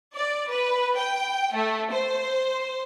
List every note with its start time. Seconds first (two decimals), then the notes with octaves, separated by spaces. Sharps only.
0.15 D5
0.50 B4
0.96 G5
1.53 A3
1.92 C5